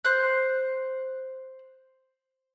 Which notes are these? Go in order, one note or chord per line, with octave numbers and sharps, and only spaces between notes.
C5 F#6